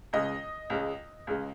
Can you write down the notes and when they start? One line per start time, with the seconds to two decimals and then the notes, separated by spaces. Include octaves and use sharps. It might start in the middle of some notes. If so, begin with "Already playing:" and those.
0.13 C#2 C#3 G#3 D#5
0.70 C#2 C#3 G#3
1.27 C#2 C#3 G#3